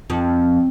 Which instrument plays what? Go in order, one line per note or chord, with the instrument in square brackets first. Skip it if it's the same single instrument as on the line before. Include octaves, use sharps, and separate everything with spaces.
[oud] F2